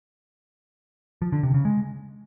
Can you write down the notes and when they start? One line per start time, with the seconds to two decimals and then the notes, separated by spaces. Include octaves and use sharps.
1.22 F3
1.32 D3
1.43 C3
1.54 C#3
1.65 G#3